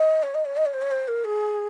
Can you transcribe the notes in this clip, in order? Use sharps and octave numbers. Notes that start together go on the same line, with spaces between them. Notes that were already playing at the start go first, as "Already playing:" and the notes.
Already playing: D#5
C#5
D#5
C#5
D#5
C#5
C5
C#5
C5
A#4
G#4